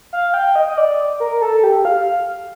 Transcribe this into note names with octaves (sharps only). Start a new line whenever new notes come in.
F5
G5
D#5
D#5
D5
A#4
A4
G4
F5